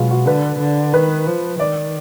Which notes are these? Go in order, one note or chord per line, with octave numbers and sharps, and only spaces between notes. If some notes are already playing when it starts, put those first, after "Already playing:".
Already playing: B2 F#3 G#3 F4
F#4
D3 B4
D3
D#3 B4
F3
D#3 D5